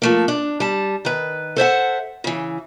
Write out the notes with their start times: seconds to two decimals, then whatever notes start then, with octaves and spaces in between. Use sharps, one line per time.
0.02 F3 A3 A#3
0.28 D4
0.60 G3 A5
1.05 D#3 B4
1.56 A4 C5 E5 F#5
2.24 C#3 E3